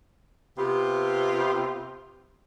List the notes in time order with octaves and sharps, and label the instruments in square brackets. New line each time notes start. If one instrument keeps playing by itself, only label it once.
[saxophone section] C3 B3 F4 G4